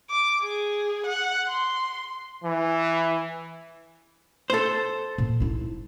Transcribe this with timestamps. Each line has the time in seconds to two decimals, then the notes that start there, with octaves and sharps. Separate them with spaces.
0.10 D6
0.43 G#4
1.07 F#5
1.48 C6
2.44 E3
4.50 A4 C5
5.18 A#2
5.40 D#4 E4